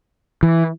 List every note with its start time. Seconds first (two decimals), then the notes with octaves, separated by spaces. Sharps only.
0.43 E3